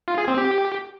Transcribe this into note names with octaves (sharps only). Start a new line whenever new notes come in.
F4
G#4
C4
G4